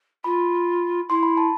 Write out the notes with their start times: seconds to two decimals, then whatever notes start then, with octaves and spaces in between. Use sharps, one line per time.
0.24 F4 B5
1.09 E4 C6
1.23 B5
1.37 A5